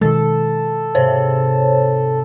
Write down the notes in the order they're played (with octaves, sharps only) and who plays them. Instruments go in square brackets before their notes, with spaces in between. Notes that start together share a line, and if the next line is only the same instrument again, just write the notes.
[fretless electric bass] B2 D#3 G#3 [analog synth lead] A4
[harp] G#2 C3 [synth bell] C5 C#5